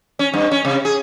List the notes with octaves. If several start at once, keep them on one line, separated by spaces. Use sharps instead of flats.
C#4
G2
C#4
C3
G#4